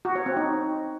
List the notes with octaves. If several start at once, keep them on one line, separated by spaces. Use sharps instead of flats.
F#4
C#5
C4
D#4